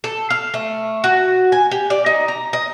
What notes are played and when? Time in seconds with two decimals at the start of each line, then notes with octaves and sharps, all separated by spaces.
0.04 A4
0.30 F5
0.54 A3
1.04 F#4
1.52 G#5
1.71 G4
1.90 D5
2.06 D#4
2.28 A#5
2.53 D#5